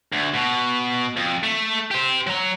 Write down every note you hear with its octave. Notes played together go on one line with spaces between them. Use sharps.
D2
B2
F2
A3
G4 C5
F#3 A#5